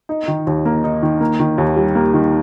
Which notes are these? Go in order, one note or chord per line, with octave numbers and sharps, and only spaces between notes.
D#4
D#3
D#2
A#3
D#4
D#3
A#3
D#3
D#2
G3
A#3
D#3